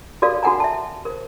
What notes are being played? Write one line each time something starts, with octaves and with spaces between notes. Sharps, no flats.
F#4 A4 A#4 D5 F5
F#4 A4 F#5 G#5 A#5
E5 A5
A#4 C5